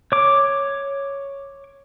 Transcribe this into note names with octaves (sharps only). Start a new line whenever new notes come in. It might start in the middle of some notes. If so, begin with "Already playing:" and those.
C#5 D6